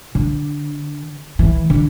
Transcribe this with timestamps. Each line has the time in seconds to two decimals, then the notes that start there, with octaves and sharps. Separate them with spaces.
0.15 D3
1.39 E3
1.70 D3